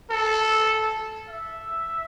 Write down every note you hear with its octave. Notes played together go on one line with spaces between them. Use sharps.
A4
E5